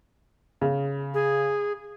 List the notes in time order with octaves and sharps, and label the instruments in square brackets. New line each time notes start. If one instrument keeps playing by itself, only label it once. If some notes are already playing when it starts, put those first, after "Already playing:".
[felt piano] C#3
[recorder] G#4